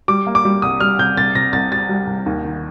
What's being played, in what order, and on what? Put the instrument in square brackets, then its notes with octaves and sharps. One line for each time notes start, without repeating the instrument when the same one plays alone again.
[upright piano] G3 [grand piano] D6
[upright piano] A#3
[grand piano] D6
[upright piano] G3
[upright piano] C2 [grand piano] D#6
[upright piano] G3 [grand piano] F6
[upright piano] C3 [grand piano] G6
[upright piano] C2 [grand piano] A6
[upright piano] C3 [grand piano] A#6
[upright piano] C2 [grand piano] A6
[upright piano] G3 [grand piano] A6
[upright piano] G3
C2
D#2
D#3